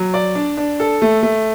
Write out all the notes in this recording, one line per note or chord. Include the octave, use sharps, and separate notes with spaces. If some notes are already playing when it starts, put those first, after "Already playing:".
Already playing: F#3
D5
D4
D4
A4
A3
A3